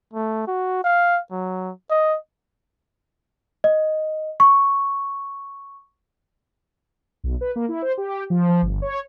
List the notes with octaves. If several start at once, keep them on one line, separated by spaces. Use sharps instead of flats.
A3
F#4
F5
F#3
D#5
D#5
C#6
B1
B4
A#3
E4
C5
G4
F3
F3
G1
C#5